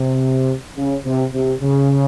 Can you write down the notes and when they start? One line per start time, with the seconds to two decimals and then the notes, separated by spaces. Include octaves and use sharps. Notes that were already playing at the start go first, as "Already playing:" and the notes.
Already playing: C3
0.77 C#3
1.05 C3
1.33 C3
1.61 C#3